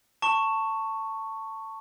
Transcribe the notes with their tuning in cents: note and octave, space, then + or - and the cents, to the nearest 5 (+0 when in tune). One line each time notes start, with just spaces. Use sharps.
A5 +20 C#6 +0